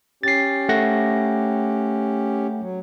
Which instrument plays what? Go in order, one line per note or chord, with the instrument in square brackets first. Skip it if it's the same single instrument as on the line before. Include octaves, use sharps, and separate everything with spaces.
[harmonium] C#4 G4 [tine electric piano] A6 C7
[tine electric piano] A3 F#5 A#6
[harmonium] F#3